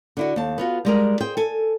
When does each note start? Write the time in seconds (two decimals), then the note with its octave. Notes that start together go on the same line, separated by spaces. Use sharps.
0.17 D3 E4 F#4
0.36 D#2 A5
0.58 B3 F4 F#4
0.85 G3 G#3 A#4
1.21 G#4 C5 G5
1.37 A4 G#5